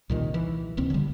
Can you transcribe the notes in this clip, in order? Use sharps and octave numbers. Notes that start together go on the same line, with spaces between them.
C2 A#2 D#3
E3
D#1 C2 C4
D3 G3